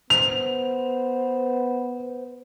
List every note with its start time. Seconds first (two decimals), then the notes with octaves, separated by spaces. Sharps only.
0.10 B3 C5 F7